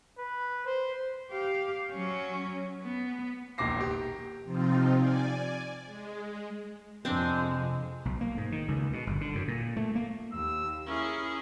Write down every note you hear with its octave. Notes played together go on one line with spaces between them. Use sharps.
B4
C5
G4 F5
F#3 C#4
B3
E1 A#1 D#2 D6 A#6 C7
G4
C3 F3 C4 D#4 F4
D5 G#5
G#3
F2 C3 F3 G#3 C4 D4
B1
A#3
G#2
D#3
C#2
B2
G1
D3
F#2
A#2
A3
A#3
D#2 E6
C#4 E4 G#4 A#4